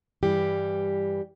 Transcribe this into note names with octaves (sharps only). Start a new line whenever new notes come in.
G2 E3 G3 G4